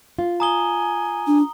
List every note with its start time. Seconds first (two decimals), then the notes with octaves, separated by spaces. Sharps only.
0.19 F4
0.40 G#5 A#5 D#6 G7
1.27 D4